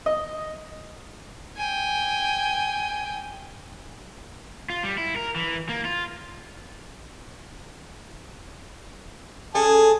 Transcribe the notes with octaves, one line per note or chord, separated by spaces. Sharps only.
D#5
G5 G#5
F4
G3
E4
A#4
E3
A#3
F4
C#4 G#4 A4 G#5 A5